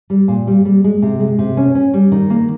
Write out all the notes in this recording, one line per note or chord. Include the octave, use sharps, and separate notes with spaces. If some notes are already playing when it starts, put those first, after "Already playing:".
G3
A#2
G3
G3
G#3
C3
G#3
C3
C#4
C#4
G3
D#3
A#3